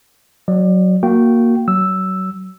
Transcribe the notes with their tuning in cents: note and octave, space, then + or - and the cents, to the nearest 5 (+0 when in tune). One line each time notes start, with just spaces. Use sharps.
F#3 +0 D5 +30
A#3 +0 F#4 -10 G5 -15
F#3 +30 E6 +0